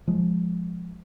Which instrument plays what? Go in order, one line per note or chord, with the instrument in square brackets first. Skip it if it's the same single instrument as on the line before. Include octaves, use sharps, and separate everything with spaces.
[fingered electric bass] F3 G#3